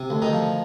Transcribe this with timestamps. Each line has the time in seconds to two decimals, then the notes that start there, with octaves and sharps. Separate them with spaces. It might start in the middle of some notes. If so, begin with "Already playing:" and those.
Already playing: C3
0.10 D2
0.22 D#3 D#4
0.33 F3